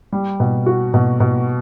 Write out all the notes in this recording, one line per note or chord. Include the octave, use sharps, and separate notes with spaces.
G3
B2
F#4
B2
B2